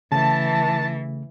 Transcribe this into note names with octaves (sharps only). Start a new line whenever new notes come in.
C#3 E3 A3 A5